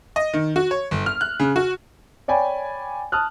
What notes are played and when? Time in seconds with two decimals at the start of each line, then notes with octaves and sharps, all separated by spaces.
0.16 D#5
0.34 D#3
0.56 F#4
0.71 C#5
0.91 G1
1.06 F6
1.21 F#6
1.40 C#3
1.56 F#4
2.28 C#5 D5 G5 G#5 B5
3.12 A5 D#6 F6 F#6